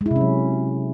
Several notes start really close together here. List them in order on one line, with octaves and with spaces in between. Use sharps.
G#3 E4 C3 C#4 F#3